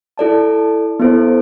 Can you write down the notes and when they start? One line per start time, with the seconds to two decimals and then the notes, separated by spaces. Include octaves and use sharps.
0.18 E4 A4 D5 A5
1.00 B3 E4 A4 C5